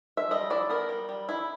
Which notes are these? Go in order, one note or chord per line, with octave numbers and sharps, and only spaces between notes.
E5
G3 D#5
E4 D5
B3 A#4
G3
G3
E4